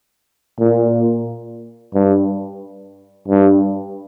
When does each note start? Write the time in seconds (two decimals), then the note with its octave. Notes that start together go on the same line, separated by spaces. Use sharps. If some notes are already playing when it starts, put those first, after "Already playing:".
0.59 A#2
1.94 G2
3.28 G2